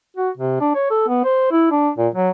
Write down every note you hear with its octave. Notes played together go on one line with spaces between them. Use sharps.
F#4
C3
D4
C#5
A4
B3
C5
E4
D4
A#2
F#3